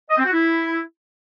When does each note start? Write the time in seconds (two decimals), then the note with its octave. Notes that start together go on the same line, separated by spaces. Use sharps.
0.10 D#5
0.18 C4
0.25 F#4
0.33 E4